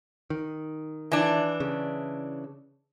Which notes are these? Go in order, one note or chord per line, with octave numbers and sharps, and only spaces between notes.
D#3
E3 D4
C#3